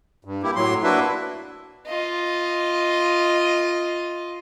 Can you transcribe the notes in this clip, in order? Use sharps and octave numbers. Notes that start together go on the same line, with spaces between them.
G2
A#3 E4 G4
A2 F#3 C6
A#3 D4 E4 F#4 B4 E5
F4 D#5